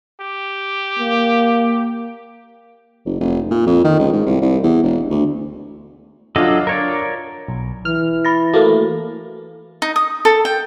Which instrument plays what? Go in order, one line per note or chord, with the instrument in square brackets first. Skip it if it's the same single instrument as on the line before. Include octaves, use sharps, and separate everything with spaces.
[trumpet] G4
[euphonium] A#3
[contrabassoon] F#1
F1
A#2
F2
D#3
C#2
G#2
C2
C2
E2
E1
D2
[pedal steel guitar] F#3 A4 D#5 [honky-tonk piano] D4 F4
[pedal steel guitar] A#4 C#5 D5
[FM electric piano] B1
[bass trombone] E3 [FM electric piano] F6
[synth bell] B5 A6 A#6
[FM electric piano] A3 A#3 [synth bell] F#4 A4
[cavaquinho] D#4
D#6
A4
G5